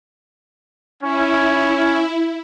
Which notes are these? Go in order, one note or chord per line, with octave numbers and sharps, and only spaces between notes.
C#4 E4